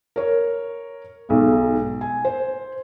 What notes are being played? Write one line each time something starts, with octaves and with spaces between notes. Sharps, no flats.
A#4 C#5
B1 G#2
G#5
C5